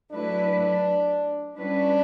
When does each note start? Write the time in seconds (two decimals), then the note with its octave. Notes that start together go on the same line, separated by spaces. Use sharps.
0.12 F#3 A3 D4 E4 B4
1.57 G3 C#4 D4 E4 B4